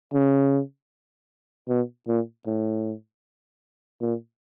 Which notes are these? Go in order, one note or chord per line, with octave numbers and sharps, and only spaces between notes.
C#3
B2
A#2
A2
A#2